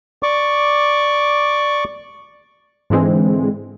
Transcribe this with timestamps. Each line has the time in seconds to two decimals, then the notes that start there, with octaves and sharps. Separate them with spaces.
0.23 D5 C#6 D6
2.90 G#2 D3 E3 G#3 C4